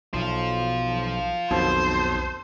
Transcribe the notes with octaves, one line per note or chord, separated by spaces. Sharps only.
B1 F3 F4
B1 F2 B2 D#3 C5